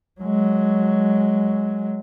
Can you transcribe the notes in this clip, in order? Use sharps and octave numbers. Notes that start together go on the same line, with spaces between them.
F#3 G#3